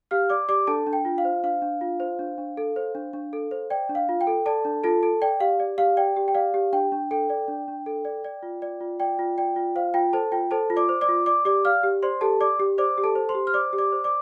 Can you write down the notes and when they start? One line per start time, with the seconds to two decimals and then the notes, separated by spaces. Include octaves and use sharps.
0.11 G4 F5 F6
0.30 D5 D6
0.49 G4 D5 D6
0.67 D4 A4 A5
0.87 D4
0.93 G5
1.05 F4
1.18 F5
1.25 C5
1.44 D4 F5
1.62 D4
1.81 F4
2.00 C5
2.19 D4
2.38 D4
2.57 A4
2.76 C5
2.95 D4
3.13 D4
3.33 A4
3.51 C5
3.70 D5 G5
3.89 D4
3.95 F5
4.09 F4
4.21 G5
4.27 A4
4.46 A4 D5 A5
4.65 D4
4.84 F4 A4 A5
5.03 A4
5.22 D5 G5
5.40 G4 F5
5.60 D5
5.78 G4 F5
5.97 D5 G5
6.16 G4
6.28 G5
6.35 D5 F5
6.54 G4
6.73 D4 G5
6.92 D4
7.11 A4 G5
7.30 D5
7.48 D4
7.68 D4
7.86 A4
8.05 D5
8.24 D5
8.43 F4
8.62 D5
8.80 F4
9.00 D5 G5
9.19 F4
9.38 D5 G5
9.56 F4
9.76 C5 F5
9.94 F4 G5
10.13 A4 C5 A5
10.32 F4 G5
10.51 A4 C5 A5
10.70 F4
10.76 D5 D6
10.89 C5
11.01 D5 D6
11.09 F4
11.26 D5 D6
11.45 G4 D5 D6
11.65 D5 F5 F6
11.83 G4
12.03 C5 D5 C6
12.21 G4 A4 A5
12.41 D5 D6
12.60 G4
12.78 C5 D5 D6
12.98 G4
13.04 A4 A5
13.15 C5
13.29 C5 C6
13.35 G4
13.47 F6
13.54 C5 D5 D6
13.73 G4
13.78 D5 D6
13.92 C5
14.04 D5 D6